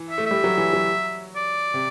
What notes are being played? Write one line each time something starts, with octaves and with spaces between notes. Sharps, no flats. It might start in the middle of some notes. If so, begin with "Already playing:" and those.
Already playing: E3
E5
A3
G3 E5
F#3
E3
F#3
D5
C3